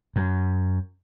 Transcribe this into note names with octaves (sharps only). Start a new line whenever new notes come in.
F#2